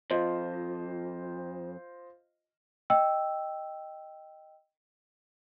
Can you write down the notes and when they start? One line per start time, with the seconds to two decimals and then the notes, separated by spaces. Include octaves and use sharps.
0.11 F2 F4 C5 D#5
2.90 D#5 G5 E6